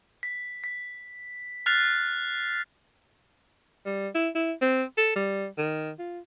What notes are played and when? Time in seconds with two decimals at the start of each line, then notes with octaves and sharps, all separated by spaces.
0.23 B6
0.64 B6
1.66 F6 F#6 A6 B6 C7 F7
3.86 G3
4.15 E4
4.35 E4
4.61 C4
4.97 A4
5.15 G3
5.58 D#3
5.99 F4